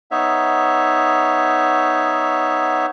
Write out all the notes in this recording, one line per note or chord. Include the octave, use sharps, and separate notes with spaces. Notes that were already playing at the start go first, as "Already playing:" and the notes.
B3 D#4 C#5 E5